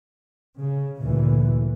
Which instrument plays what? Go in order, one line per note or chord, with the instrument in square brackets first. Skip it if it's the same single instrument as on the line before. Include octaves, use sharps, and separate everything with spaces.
[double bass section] C#3
D2 G2 A#2 E3